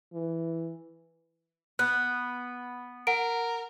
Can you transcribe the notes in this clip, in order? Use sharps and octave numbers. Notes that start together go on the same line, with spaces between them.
E3
B3 F#6
A#4 F#5 D7